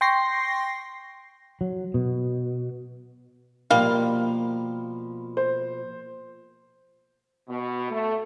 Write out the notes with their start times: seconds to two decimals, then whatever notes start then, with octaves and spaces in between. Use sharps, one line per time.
0.01 G5 C6 C#6 A#6 C7
1.61 F#3
1.94 B2
3.70 B2 F3 G3 A#3 A#4 F5
5.37 C5
7.48 B2
7.91 A3